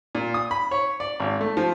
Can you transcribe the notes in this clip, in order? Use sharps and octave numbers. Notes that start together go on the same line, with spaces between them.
A#2
D#6
B5
C#5
D5
G#1
A3
F3